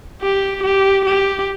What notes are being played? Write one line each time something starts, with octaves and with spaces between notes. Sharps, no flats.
G4
G4
G4